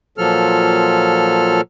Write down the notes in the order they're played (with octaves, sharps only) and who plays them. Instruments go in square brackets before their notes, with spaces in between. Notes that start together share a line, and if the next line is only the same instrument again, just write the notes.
[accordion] A#2 F3 F#3 A4 F6